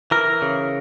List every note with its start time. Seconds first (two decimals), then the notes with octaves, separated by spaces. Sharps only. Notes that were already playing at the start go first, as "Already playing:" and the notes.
0.11 E3 A#4
0.42 C#3